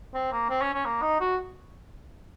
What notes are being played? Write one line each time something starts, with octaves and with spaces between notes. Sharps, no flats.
C4
A#3
C4
C#4
C#4
A#3
D#4
F#4